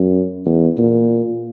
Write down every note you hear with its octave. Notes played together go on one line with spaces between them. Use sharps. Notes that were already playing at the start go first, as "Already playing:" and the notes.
Already playing: F#2
E2
A#2